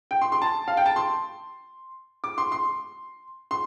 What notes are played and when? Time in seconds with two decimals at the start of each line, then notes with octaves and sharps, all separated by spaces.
0.11 G5
0.21 C6
0.32 C6
0.42 A5
0.68 F5
0.77 G5
0.86 A5
0.96 C6
2.24 D6
2.38 C6
2.52 C6
3.51 C6